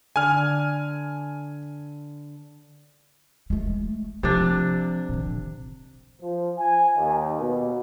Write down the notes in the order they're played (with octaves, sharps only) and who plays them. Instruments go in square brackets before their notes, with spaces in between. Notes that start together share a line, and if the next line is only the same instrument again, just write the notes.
[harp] D3 [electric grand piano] G#5 F6
[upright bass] G#3 A3
[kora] C3 D4 [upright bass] F3
[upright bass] A#2 D#3
[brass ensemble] F3
G#5
D#2
B2